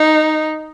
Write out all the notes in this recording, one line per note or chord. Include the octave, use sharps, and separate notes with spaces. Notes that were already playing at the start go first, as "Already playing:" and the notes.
Already playing: D#4